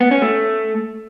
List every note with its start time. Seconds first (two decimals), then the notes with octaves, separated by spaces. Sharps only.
0.01 B3
0.11 C#4
0.22 A3